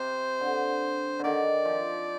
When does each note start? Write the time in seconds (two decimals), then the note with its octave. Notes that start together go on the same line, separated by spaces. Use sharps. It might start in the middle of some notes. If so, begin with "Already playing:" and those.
Already playing: C3 C5
0.41 D3
1.19 D3 D#3 D5
1.65 F3